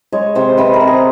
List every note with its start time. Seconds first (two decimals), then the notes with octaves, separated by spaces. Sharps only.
0.12 G#3 C#5
0.35 C3 C5
0.57 C3 B4
0.74 A#4
0.81 C3
0.87 G#4